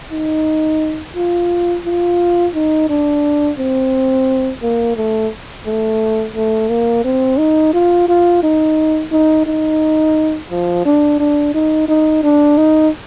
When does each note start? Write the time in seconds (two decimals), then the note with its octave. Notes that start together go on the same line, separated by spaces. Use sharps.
0.12 D#4
1.16 F4
1.85 F4
2.55 D#4
2.90 D4
3.58 C4
4.62 A#3
4.97 A3
5.66 A3
6.35 A3
6.69 A#3
7.05 C4
7.39 D#4
7.74 F4
8.08 F4
8.43 D#4
9.12 D#4
9.46 D#4
10.51 F3
10.85 D4
11.20 D4
11.55 D#4
11.88 D#4
12.23 D4
12.58 D#4